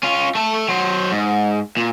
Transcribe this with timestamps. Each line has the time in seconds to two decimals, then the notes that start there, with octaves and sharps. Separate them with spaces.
0.03 C#4 F4
0.35 A3 A4
0.69 F#3 C5
1.12 G#2
1.77 A#2